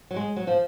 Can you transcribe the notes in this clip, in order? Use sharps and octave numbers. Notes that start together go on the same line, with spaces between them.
F#3
G#3
F#3
F3